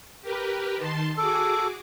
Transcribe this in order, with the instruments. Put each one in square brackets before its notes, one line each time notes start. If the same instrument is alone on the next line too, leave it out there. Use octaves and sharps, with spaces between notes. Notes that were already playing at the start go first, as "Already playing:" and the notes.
[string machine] G4 A#4 B4
D#3 A5 C6
[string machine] F#4 G#4 D6 [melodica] A4